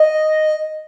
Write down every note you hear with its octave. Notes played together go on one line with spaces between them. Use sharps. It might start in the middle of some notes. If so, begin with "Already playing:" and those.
Already playing: D#5